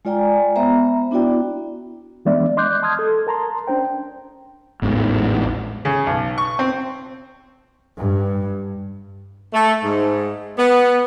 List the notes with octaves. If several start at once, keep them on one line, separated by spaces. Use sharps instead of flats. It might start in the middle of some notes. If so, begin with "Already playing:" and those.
G#3 F4 D5 G5 G#5 A#5
B3 C5 E5 A#5
B3 D4 E4 F#4 D5 G5
E3 G#3 B3 D4 D5 E5
D#5 C6 D6 F#6 G6
A5 C6 D#6 F6 G#6
A4
A#4 A5 A#5 C6
C#4 D4 C5 G5
A1 E2 G#2
C#3
B1
C#6
C4
G2
A3
G#2
B3